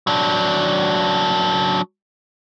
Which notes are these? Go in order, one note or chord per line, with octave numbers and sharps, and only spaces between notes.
F#3 D4